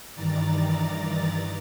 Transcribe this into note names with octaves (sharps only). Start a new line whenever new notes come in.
G2 D#3 E3 D5 A#5 A6